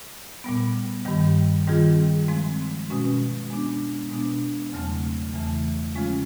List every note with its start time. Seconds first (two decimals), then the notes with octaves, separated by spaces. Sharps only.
0.44 A#2 G3 B3
1.05 G2 D#3 G3
1.67 D#3 G3 C4 F4 G#4
2.28 F3 G#3 C4
2.90 B2 G#3 C#4 F#4
3.50 G#3 B3 D4
4.11 B2 G#3 B3 D4
4.73 E2 C#3 F#3 A3 C4
5.34 E2 C#3 E3 A3
5.95 C#3 F3 G#3 C#4 F4